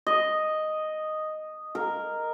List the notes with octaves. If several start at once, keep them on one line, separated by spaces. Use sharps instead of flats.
D#5
A#4